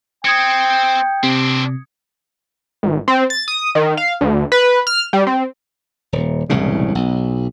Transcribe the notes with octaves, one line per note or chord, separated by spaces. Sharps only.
C4 G5 D#6 G#6 C#7
C3 C4 D4
G#1
C4
A6
D#6
D#3
F5
D2
B4
F6
G3
C4
D#1
E1 C2 A2 C#3
B1